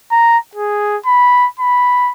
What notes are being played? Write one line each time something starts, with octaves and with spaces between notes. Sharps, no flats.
A#5
G#4
B5
B5